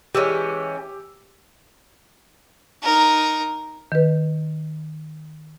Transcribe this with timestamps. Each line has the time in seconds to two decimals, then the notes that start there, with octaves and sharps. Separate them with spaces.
0.15 E3 G#3 C#4 G4 E6
2.82 D#4 A#4
3.92 D#3 B4